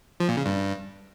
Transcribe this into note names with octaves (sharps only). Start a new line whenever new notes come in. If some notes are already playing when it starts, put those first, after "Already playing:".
F3
A#2
C#3
G2